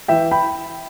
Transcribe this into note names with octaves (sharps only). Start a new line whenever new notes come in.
E3 E5 G5
G5 B5